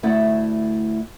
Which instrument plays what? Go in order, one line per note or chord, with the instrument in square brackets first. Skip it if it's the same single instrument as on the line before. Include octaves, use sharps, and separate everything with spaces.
[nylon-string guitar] D2 A3 E4 D5 F#5